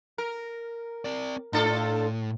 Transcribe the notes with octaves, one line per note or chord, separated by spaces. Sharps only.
A#4
C4 D5
A2 D4 F4 A4